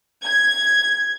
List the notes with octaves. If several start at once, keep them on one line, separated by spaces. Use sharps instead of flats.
G#6